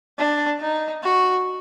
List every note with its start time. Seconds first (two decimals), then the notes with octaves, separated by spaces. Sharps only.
0.18 D4
0.60 D#4
1.03 F#4